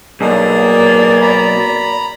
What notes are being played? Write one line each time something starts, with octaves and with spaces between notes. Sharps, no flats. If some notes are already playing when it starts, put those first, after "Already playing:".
B1 A#3 G#4 D5
A#5 B5